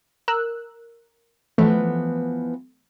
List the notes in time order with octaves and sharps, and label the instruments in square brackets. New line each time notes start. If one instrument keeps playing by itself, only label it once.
[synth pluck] A#4 E6 F#6
[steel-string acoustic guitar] E3 F3 B3 [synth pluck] A3